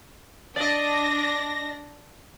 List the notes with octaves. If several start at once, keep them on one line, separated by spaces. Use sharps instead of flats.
D4 D5 D#5 A#6